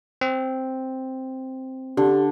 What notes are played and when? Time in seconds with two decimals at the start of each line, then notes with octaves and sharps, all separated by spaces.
0.21 C4
1.97 D3 G4